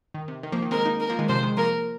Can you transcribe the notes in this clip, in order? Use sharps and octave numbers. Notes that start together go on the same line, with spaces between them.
D#3
C3
D#3
F3 A#3
D#3
G#3 C4 A#4
A#3 D#4
A#4
F3 A#3
D#3 G#3
C3 F3 C5
D#3 G#3
F3 A#3 A#4